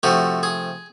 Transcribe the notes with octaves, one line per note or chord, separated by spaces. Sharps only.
C3 F3 A3 F#4
G#4